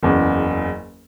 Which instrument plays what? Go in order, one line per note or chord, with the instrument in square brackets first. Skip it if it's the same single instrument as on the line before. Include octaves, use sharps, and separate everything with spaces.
[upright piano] F#1 E2 C#3